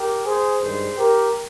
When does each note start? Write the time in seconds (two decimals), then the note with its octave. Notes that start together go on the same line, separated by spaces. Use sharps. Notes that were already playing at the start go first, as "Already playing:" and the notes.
Already playing: G4 A#4
0.25 G#4 C5
0.61 G2 D#3 G#3 G#4 C5
0.97 G4 A#4